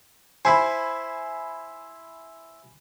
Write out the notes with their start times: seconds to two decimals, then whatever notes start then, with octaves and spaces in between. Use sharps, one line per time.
0.45 E4 C5 G#5 B5